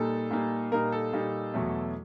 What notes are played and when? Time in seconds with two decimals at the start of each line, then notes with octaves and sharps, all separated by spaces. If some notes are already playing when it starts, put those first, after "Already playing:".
Already playing: A#2 G3 A#3 D#4 A4
0.31 A#2 G3 A#3 D#4
0.72 A#2 G3 A#3 D#4 A#4
0.92 A4
1.13 A#2 G3 A#3 D#4
1.54 E2 B2 F#3 A3